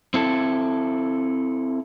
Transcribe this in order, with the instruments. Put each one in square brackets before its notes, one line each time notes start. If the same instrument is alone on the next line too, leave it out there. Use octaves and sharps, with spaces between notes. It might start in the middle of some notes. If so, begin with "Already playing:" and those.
[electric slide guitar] C4 E4 A4